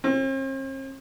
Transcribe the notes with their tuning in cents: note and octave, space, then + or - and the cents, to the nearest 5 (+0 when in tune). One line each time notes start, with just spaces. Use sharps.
C4 +45